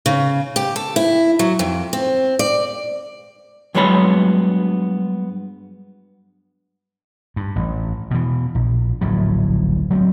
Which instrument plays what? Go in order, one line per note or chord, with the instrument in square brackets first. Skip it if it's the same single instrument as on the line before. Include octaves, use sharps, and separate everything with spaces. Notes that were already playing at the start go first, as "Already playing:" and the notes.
[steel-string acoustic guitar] C#3
G4
A4
E4
F#3
F2
C4
D5
[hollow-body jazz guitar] G2 F#3 G#3 B3 C#5 B5
[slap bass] G2
A1
B2 E3
A#1
D1 A#1 A2 F#3
F#3 A3 B3 C4